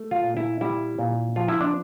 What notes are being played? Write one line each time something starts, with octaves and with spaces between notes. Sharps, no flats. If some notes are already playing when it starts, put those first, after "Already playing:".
Already playing: A3
F4
A#2
E4
G3 E4
A#2
F3 F4
E4
D4